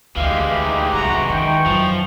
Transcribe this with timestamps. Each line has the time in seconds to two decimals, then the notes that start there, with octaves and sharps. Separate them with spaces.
0.16 D2 E3 G#3 G4 F5
0.62 D#4
0.94 F#2 C3 F#4 A#5
1.30 D#3 G5 C#6
1.66 F#2 F3